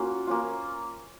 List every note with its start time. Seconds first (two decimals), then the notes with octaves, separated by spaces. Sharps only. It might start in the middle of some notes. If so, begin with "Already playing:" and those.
Already playing: A#3 C#4 F4 F#4
0.27 A#3 C#4 F4